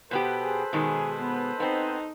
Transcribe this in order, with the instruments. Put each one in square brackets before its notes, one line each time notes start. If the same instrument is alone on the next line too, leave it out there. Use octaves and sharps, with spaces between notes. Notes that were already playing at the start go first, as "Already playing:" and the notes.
[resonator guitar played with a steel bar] B2 B3 G4 [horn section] A4 B4 C5
[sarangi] G#4
[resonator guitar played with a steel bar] B2 D#3 G#3 [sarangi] G#4
[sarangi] B3
[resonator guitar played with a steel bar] B3 C4 [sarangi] D#4